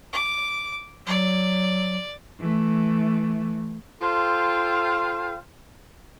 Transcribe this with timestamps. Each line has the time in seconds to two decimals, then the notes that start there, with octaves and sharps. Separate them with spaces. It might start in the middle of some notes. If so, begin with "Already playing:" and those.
0.13 D6
1.07 F#3 D5
2.40 E3 A3
4.02 F4 A4 C5 F5 G5